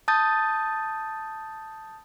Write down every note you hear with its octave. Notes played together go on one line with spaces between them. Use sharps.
A5 D#6 G6 A6